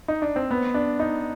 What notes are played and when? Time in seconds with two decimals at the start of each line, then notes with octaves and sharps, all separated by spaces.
0.08 D#4
0.22 D4
0.36 C4
0.51 B3
0.74 D4
1.00 D#4